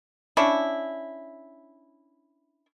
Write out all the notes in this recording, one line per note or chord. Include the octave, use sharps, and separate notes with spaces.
C#4 D4 E4